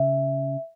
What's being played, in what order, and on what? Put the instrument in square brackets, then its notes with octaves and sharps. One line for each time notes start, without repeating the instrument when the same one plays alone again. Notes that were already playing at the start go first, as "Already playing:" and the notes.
Already playing: [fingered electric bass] C#3 [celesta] E5